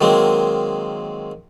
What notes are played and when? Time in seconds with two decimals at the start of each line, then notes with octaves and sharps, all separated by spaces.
0.01 D#3 F#3 G#3 A#3 C4